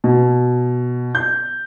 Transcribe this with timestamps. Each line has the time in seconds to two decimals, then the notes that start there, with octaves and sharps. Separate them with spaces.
0.04 B2
1.15 G6